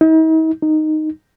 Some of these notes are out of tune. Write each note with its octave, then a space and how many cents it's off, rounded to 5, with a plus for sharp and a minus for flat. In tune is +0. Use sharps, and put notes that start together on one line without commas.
D#4 +45
D#4 -5